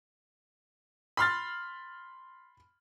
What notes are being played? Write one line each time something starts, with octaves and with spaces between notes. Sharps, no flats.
B5 C6 F6 A6